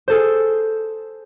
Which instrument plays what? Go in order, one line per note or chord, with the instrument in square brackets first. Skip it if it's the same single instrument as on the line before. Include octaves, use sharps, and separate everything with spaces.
[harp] G#4 A4 C5